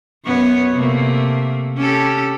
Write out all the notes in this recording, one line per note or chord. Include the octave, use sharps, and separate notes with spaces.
F#2 B3 C#5
C3 A3 A#3
C#4 G4 A4